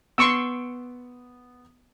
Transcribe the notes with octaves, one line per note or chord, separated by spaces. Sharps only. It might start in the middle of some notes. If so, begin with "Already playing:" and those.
B3 C6 C#6 E6 C#7 D7